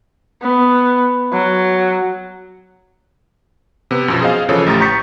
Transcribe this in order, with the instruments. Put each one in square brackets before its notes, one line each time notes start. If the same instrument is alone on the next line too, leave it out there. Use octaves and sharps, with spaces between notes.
[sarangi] B3
F#3
[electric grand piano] C3 B3
F#2 B2 F3
G#4 C5 D#5 F5
C#3 E3 F3 A4 C#5
A1 A2 G4 A#5 A6
C#6 G6 A6 B6 C#7